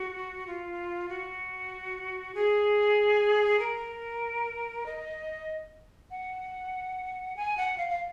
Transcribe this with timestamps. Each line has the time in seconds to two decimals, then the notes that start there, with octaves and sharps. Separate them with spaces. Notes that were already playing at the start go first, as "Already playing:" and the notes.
Already playing: F#4
0.47 F4
1.09 F#4
2.34 G#4
3.59 A#4
4.86 D#5
6.11 F#5
7.36 G#5
7.57 F#5
7.78 F5
7.90 F5